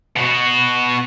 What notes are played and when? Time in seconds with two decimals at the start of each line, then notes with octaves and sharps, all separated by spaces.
0.17 B2 F#4